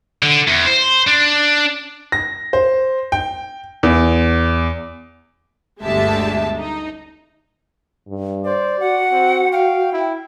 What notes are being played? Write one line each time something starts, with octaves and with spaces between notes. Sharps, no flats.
D3
E2
C5
D4
A#6
C5
G5
E2
G1 D2 G#3 G4 E5 A5
D#4
G2
C5 D5
F#4 F#5
C4
F5 G5
E4